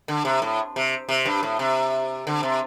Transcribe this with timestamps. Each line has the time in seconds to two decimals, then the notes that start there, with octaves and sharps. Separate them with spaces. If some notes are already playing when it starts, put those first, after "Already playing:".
0.08 D3
0.25 C3
0.42 A2
0.76 C3
1.09 C3
1.26 G2
1.43 A2
1.59 C3
2.27 D3
2.43 C3